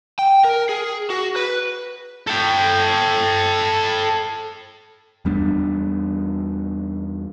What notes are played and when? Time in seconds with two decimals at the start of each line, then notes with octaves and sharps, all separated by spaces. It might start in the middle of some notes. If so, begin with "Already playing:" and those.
0.19 G5
0.45 A#4
0.69 G#4
1.10 F#4
1.36 B4
2.27 A4 G5
5.25 E2 G3 B3 D4